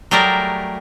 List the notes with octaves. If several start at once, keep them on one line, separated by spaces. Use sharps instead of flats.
F#3 G3 A3 G4 G#4 A#4